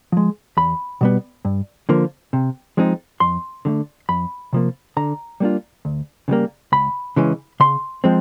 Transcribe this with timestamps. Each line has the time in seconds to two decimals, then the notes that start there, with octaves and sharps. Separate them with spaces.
0.12 F3 G#3
0.57 E2 B5
1.01 B2 G3 B3
1.45 G2
1.89 D3 F3 A#3
2.33 C3
2.77 F3 G#3 C4 D#4
3.20 F2 C6
3.65 D3 F#3 A3
4.09 F2 B5
4.53 C3 F3 A#3
4.97 D3 A#5
5.40 G3 A#3 D4 F4
5.85 D2
6.28 C#3 E3 G3 A#3
6.72 C#2 B5
7.16 C#3 E3 G#3 C#4
7.60 C#3 C6
8.04 F3 G#3 C4